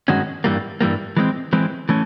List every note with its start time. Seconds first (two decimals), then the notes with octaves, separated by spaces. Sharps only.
0.08 G2 D#3 G#3 C#4 F#4
0.44 G2 E3 G3 A#3
0.81 G2 E3 G3 A#3
1.17 E3 G#3 C4
1.53 E3 G#3 C4
1.89 E3 A3 C#4